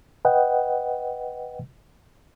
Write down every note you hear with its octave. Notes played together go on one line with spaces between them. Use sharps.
B4 D#5 F#5 G5